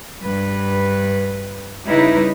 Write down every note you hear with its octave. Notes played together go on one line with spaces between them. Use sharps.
G2 B4
C#3 G3 D#4 E4 B4